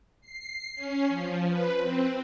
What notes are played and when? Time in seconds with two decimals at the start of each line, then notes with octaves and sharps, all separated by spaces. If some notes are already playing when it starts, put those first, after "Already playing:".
0.21 C7
0.75 C#4
1.08 F3
1.48 B4
1.77 C4